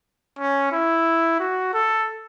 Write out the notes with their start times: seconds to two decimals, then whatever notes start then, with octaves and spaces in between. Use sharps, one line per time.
0.39 C#4
0.72 E4
1.40 F#4
1.74 A4